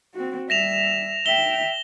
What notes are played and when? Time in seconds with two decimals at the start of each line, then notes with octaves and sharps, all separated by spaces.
0.15 C4 F#4
0.50 G3 E5 A#6 E7 F7
1.26 E5 G5 G7